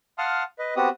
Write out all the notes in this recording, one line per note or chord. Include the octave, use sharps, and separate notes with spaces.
F5 F#5 A5 C6 D#6 F6
B4 D#5
B3 C4 F#4 G4 D#6